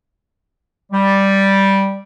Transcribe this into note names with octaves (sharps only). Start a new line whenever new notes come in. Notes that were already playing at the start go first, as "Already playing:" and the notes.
G3